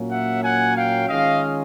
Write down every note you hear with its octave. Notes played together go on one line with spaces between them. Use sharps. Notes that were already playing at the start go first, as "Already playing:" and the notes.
Already playing: A#2 F#3 A#3 C#4
E5 F#5
F#5 G#5
F5 G5
D#3 G#3 C#4 F4 D#5 F5